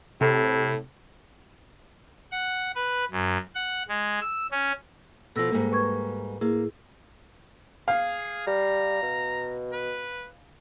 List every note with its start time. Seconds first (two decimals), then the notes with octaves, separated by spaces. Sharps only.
0.21 A2 C3 A4
2.32 F#5
2.75 B4
3.11 F#2
3.55 F#5
3.89 G#3
4.21 E6
4.52 C#4
5.36 B2 F3 A4 E6 A#6
5.51 G#2 G3 A#3
5.72 B4 C#6 G#6
6.41 A2 A#3 E4 G#4
7.88 G#4 F5
8.47 G3 A#5
9.03 B2
9.72 B4